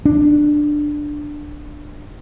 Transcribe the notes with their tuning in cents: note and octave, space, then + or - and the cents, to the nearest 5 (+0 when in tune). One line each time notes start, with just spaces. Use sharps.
D4 +10